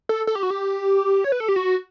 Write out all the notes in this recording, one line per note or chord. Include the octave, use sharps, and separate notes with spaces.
A4
A4
G4
F#4
G4
C#5
B4
A4
G4
F#4